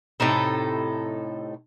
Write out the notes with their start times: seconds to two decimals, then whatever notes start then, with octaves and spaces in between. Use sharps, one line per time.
0.20 A2 C3 D#4 A4